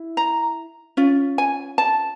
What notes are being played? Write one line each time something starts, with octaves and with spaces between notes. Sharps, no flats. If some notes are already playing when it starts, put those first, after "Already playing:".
Already playing: E4
A#5
C#4 F4
G#5
A5